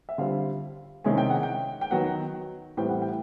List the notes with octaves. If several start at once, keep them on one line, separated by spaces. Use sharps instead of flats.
E5
D3 G3 C4 F4 F5
C3 D#3 G#3 C#4 E4 G#5
G5
F#5
G5
G5
D#3 F#3 B3 F#5
A2 E3 G3 C4 G5
F#5
G5